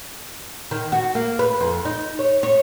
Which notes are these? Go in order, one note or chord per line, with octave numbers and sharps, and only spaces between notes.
D#3
F#4
A#3
B4
F2
D#4
C#5
C#5